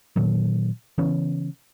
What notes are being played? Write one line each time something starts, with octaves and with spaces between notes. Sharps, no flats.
A#2 D#3 F#3
C#3 E3 B3 C#4